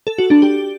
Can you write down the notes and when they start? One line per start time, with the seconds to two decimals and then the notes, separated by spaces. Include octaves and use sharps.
0.07 A4
0.18 F#4
0.30 D4
0.42 G4